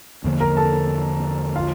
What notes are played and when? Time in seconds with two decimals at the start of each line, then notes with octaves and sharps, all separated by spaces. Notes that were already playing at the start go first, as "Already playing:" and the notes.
0.24 E2 D3 F3 A#3
0.40 A#4 A#5
0.57 A4 A5
1.56 F4 F5